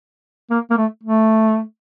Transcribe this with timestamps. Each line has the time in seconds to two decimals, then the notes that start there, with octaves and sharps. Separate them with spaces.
0.51 A#3
0.70 A#3
0.78 A3
1.04 A3